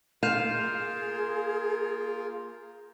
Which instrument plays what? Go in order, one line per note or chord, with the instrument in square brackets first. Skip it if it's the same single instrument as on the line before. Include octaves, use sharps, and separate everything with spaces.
[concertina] A#3 F4 A#4 [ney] G#4 [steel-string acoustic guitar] F5 [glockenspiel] G6 D#7 E7